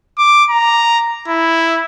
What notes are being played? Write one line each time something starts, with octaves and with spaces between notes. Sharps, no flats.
D6
A#5
E4